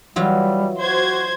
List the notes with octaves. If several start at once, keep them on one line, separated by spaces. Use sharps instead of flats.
E3 F#3 G3 F4
F#4 C5 G#6